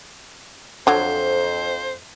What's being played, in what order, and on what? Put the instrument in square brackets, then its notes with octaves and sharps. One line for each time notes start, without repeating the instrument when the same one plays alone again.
[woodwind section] F2 [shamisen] D3 F#3 [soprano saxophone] C5